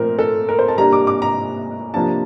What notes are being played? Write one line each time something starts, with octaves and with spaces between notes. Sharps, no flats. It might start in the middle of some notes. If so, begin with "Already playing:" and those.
Already playing: A#2 F3 A3 C4 A#4
A4
A#4
C5
A5
C3 G3 A#3 D4 A#5
D6
D6
A#5
C3 F3 A#3 D4 A5